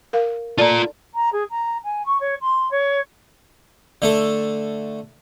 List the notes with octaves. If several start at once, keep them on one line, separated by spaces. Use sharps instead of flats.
A#4 F5
F4 A4 D5 A5 A#5
A#5
G#4
A#5
G#5
C#6
C#5
C6
C#5
D3 A3 A4